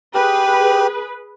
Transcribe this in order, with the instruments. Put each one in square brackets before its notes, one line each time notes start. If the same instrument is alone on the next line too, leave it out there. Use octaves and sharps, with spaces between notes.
[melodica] G4 [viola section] G#4 B4